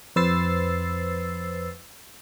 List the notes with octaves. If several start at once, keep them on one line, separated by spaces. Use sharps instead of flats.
F2 B4 C5 E6 A6 C7